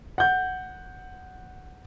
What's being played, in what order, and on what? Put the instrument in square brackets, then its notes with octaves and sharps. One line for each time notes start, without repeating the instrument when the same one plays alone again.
[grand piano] F#5 G6